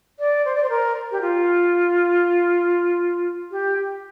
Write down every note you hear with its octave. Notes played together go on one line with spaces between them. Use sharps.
D5
C5
D5
C5
A#4
G4
F4
G4